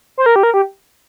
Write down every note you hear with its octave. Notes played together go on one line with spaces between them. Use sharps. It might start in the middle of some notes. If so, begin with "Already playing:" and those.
C5
A#4
G4
A#4
G4